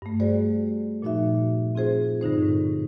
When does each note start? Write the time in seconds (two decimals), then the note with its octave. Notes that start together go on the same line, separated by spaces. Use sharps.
0.02 G2 A3
0.20 G3 A3 F#4 G#4 C5 D5
1.02 A#2 F3 D#4 F#4 E5
1.75 C4 F4 G#4 C5
2.21 G2 D3 D#4 C5
2.42 A2